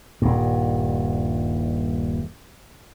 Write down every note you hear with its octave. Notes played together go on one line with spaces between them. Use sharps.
D#1 G2